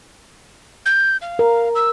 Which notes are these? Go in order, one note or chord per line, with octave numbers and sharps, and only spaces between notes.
G6
F5
A#4
E6